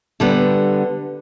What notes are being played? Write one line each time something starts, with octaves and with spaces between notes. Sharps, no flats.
D3 G3 B3